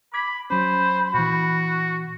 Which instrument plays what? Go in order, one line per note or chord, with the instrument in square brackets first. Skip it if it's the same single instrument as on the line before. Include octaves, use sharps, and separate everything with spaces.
[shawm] B5 [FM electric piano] D6 G#6 B6
[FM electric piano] F#3 C#4 [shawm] C5 [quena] B5
[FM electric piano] A#2 E3 [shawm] F#4